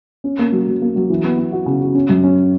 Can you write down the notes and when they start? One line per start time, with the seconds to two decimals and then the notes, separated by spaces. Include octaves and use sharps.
0.24 C#4
0.39 A#3
0.52 F#3
0.67 F#3
0.82 A#3
0.96 F#3
1.10 E3
1.24 B3
1.38 B3
1.52 F#4
1.66 C#3
1.81 F#4
1.95 C#4
2.09 F#2
2.24 C#4